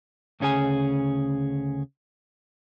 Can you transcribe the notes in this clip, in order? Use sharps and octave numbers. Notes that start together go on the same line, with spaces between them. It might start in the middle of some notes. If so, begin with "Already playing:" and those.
D2 C#3 C#4 G#4 G#5